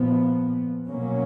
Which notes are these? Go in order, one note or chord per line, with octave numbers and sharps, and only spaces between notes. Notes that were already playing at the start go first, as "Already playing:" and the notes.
Already playing: A#2 F3 B3
B2 F#3 A#3 C#4